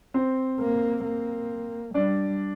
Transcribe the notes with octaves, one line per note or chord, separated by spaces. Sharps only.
C4 C5
A#3
A#3
G3 D4 D5